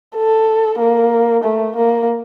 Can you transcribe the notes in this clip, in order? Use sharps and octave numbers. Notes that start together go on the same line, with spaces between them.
A4
A#3
A3
A#3